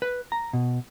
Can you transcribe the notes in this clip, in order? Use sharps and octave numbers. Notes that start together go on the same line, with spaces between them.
B4
A#5
B2